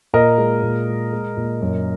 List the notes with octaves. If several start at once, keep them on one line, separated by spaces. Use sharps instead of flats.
A#2 A#4 D#5
G#3
A#2
G#3
G#3
A#2
F#2